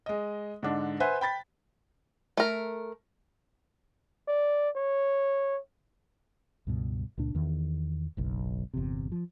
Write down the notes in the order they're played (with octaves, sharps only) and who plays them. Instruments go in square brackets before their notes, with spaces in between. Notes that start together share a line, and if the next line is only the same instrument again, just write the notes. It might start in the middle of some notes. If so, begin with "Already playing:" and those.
[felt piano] G#3 D#5
G#2 D3 D4
B4 C5 E5 F#5 G#5
G5 B5 A6 B6
[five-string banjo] A3 A#4
[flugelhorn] D5
C#5
[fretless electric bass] C#2 G2 B2
C#2 A#2 D4
E2 D#3
F#1 B1
G1 E2 C3
F3